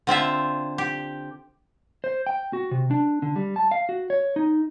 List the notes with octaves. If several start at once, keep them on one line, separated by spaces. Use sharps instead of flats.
D3 C4 F4 E5
G4
C5
G5
F#4
C3
D4
D3
G3
A5
F5
F#4
C#5
D#4